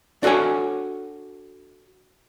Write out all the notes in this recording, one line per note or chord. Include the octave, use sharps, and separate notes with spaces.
D4 F#4 A4 C#5 G#5